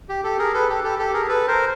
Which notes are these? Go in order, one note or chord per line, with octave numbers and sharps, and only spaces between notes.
G4
G4 A4
G#4 A#4
A4 B4
G4 A4
G4 A4
G4 A4
G#4 A#4
A4 B4
A#4 C5